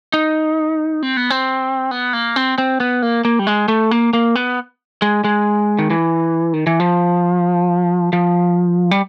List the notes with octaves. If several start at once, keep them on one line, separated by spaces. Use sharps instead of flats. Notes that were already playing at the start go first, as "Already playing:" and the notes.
D#4
C4
B3
C4
B3
A#3
C4
C4
B3
A#3
A#3
G3
G#3
A3
A#3
A#3
B3
G#3
G#3
D#3
E3
D#3
E3
F3
F3
G3